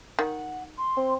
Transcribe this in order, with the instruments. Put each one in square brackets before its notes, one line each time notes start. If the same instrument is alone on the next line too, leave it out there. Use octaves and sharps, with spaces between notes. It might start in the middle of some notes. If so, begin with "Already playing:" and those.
[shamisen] D#3 [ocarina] F#5
[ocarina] C6
[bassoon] C4